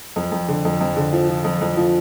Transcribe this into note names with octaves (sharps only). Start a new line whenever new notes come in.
F2
F2
D3
F2
F2
D3
F3
F3
F2
F2
F3